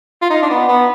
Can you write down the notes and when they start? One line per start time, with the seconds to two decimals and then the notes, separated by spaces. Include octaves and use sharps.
0.22 F4
0.30 D#4
0.42 D4
0.50 B3
0.69 B3